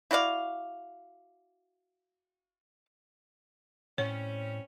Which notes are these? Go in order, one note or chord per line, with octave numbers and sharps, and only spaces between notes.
E4 F#4 D5 F5
A2 G3 C4 C#4 C#5